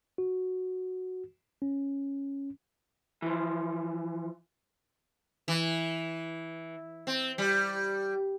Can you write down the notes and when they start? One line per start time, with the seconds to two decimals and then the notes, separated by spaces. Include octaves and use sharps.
0.18 F#4
1.62 C#4
3.22 E3 F3
5.48 E3
7.07 C4
7.38 G3